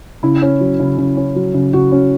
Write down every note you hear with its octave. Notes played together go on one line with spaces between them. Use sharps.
C#3 E4
C#4
F#3
C#3
C#3
C#4
F#3
C#3
C#3 F#4
C#4